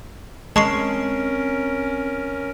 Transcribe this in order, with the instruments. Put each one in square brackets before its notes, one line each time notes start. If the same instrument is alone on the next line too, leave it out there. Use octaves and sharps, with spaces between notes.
[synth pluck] G#3 [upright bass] C4 [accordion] C#4 A#4 [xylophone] A5 C#6 C7